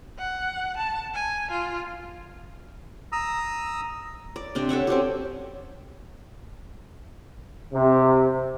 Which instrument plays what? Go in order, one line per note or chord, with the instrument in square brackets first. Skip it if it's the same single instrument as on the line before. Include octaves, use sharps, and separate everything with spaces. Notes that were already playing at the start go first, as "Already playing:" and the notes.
[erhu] F#5
A5
G#5
F4
[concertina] A#5 D#6 E6
[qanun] D5
C3 C4 D4
A4 C#5 E5 F#5
C4 C#4 F#4 G4
[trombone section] C3